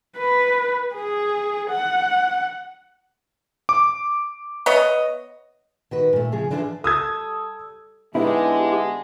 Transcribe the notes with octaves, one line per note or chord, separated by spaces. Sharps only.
B4
G#4
F#5
D6
B3 C#5 D#5
D#3 F#4 B4
A#2 A3
C#3 F3 G#4
D3 E3 F3 D4 F#4 G#4
G3 G4 A4 D#6 E6 G#6
D3 G#3 B3 D#4 E4 G4